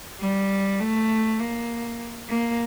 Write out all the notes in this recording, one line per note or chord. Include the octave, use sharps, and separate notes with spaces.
G3
A3
A#3
A#3